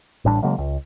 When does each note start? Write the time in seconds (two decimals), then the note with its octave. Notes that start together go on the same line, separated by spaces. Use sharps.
0.25 A1 A2 G3 D4
0.43 C#3 F#3 G#3 A#3
0.58 C#2